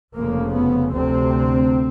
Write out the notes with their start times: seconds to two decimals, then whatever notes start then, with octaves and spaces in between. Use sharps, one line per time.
0.14 F1 F2 C#3 A#3
0.53 B3
0.93 D2 C3 C4